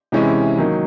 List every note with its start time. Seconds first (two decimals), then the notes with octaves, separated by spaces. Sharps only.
0.12 C3 E3 G#3 C#4 E4
0.58 D#3 F#3 A#3 D#4